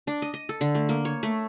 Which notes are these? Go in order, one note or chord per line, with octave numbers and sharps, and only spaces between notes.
D4
D#5
D#5
A4
D3
A3
A#3
C#5
A3